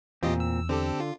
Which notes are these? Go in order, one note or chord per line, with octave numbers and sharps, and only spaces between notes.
E2 A#2 C4 F4 G4 D#5
E6
D3 C4 G4 A4
F4